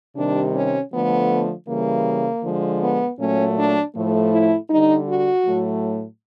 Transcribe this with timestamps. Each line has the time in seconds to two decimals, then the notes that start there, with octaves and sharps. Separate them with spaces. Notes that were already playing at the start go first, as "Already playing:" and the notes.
0.16 C3 D#3 G3 D4
0.54 C#4
0.91 D3 F3 A3 B3
1.67 C#3 E3 G3 A#3
2.43 D3 F3 G#3
2.81 B3
3.18 A#2 F#3 A3 C#4
3.56 D4
3.94 A2 F3 A3
4.31 E4
4.69 D3 G3 D#4
5.06 F#4
5.44 A2 F#3 A3